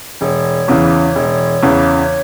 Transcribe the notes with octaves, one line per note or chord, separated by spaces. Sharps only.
E1 C#5
E2 C#3 E3
E1
E2 C#3 E3